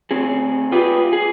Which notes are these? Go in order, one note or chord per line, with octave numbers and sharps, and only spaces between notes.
D2 C4 G#4
F4 G4 G#4 B4 D5
G#4